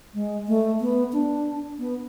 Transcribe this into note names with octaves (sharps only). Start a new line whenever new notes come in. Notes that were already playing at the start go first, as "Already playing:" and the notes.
G#3
A3
B3
D4
B3